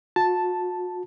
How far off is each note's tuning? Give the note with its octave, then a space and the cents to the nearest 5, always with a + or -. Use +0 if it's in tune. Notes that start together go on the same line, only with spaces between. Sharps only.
F#4 -40 A5 +0